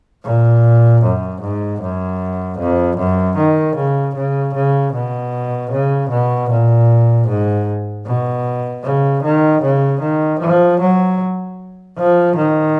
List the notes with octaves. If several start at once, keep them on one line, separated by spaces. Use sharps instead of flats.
A#2
F#2
G#2
F#2
F2
F#2
D#3
C#3
C#3
C#3
B2
C#3
B2
A#2
G#2
B2
C#3
D#3
C#3
D#3
F3
F#3
F3
D#3